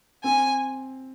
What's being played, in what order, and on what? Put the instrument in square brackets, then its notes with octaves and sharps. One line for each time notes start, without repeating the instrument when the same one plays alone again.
[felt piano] C4 [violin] G#5